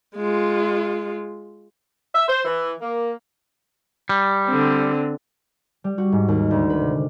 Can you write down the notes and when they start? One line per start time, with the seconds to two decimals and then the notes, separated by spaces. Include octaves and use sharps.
0.16 G#3 F4
2.15 E5
2.28 C5
2.45 E3
2.81 A#3
4.09 G3
4.47 D3 C4
5.84 G3
5.98 F#4
6.12 G#2
6.28 D#2
6.51 D2
6.70 B4
6.81 C3